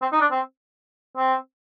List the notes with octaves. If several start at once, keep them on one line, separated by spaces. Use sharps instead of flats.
C4
D#4
D4
C4
C4